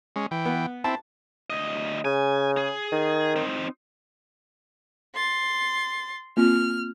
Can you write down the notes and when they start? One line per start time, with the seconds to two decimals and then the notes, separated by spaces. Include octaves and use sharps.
0.16 G#3 C#4
0.31 E3 G5
0.45 B3
0.84 C4 E4 A5
1.50 D2 D#5
2.05 C#3 G#5
2.57 G#4
2.92 D#3
3.36 C4 D#4
5.16 C6 A6
6.37 A#3 C4 F4 F6